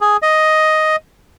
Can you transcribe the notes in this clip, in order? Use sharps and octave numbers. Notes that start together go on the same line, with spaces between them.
G#4
D#5